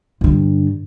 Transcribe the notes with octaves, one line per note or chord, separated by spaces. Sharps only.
G2 D3